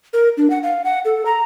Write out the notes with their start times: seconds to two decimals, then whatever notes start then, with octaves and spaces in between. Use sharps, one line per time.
0.13 A#4
0.37 D4
0.50 F#5
0.63 F5
0.84 F#5
1.05 A4
1.26 A#5